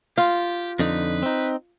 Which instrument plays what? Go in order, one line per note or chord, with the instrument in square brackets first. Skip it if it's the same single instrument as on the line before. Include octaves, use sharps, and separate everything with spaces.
[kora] F4 [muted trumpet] G4
[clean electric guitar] F2 D3 D#4 [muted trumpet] B4
[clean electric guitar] C4 D#4